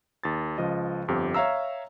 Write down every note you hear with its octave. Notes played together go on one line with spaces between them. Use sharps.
D#2 A6
C#2 F3 D#5
G1 F2 G4
C#5 E5 F5 A#5 E6